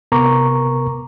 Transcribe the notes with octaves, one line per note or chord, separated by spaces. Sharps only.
C3 B3 A#4 A#5 C#6 D6